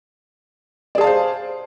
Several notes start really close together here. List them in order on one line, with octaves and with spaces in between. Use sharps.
D5 G#4 A5 F5 C5